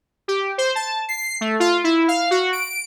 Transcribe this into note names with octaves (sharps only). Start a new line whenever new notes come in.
G4
C5
A5
C7
A3
F4
E4
F5
F#4
D7